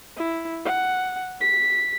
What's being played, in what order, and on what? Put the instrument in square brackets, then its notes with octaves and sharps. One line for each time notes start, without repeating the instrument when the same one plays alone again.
[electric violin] E4
F#5
B6